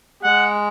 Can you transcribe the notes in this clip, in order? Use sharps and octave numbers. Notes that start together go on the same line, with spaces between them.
G#3 F#5